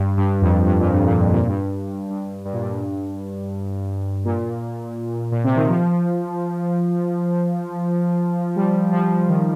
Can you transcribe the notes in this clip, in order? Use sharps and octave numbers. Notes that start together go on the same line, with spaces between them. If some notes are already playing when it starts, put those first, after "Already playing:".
Already playing: G2
G2
F2
G2
A#2
G2
A#2
G2
A#2
G2
G2
G2
A#2
G2
A#2
A#2
C3
D#3
F3
G3
F3
D#3